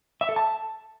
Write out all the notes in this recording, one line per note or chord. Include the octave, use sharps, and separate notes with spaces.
E5
A4
A5